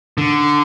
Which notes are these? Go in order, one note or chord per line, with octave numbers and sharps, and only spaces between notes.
D3